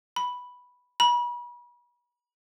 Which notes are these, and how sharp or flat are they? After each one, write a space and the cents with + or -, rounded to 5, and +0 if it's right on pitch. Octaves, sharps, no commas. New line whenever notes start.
B5 -5
B5 -35